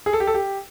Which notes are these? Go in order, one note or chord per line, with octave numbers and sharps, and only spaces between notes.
G#4
A4
G4
A4
G4